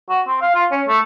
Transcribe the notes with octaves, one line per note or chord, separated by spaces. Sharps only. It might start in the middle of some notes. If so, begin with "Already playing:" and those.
F#4
C4
F5
F4
C#4
A3